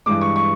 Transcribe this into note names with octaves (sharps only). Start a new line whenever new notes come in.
G2 E3 G#3 D6
C#6
C#6